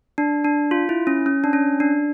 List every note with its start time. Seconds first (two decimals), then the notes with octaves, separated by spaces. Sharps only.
0.18 D4
0.45 D4
0.71 F4
0.89 E4
1.07 C#4
1.26 C#4
1.44 D4
1.53 C#4
1.80 D4